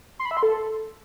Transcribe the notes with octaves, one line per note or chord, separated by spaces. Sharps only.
C6
B5
E5
C6
A4